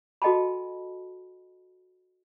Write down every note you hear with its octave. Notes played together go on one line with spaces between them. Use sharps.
F#4 A4 D#5 G5 A5 B5